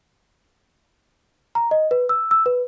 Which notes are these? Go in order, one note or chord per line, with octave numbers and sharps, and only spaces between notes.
A#5
D#5
B4
E6
E6
B4